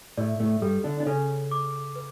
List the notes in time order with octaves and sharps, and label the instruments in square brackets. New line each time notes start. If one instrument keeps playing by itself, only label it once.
[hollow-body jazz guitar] A2 A3 [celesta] D5
[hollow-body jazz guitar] A2 A3
[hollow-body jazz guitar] G2 G3 [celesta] A4
[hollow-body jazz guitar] D3 D4
D4
[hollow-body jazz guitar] C#3 C#4 [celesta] A4
[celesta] D6
B4